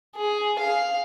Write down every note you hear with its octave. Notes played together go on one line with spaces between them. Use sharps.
G#4
F5